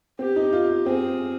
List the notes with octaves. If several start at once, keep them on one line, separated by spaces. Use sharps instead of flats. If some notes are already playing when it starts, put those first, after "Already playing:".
C4 G4
D#4
F4
C4 G#4